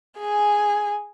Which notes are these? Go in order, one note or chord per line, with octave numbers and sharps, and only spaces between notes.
G#4 G#5